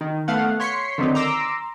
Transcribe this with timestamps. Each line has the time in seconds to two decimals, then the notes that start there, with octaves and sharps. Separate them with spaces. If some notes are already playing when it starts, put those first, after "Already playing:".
0.01 D#3
0.28 A3 B3 F5 F#5
0.60 C#5 C6 B6 C#7
0.98 D3 D#3 F#3 C4 D#4
1.15 A#5 C6 D6 E6